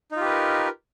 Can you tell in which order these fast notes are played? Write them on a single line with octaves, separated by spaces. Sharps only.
D#4 F4 G4 B4 A#4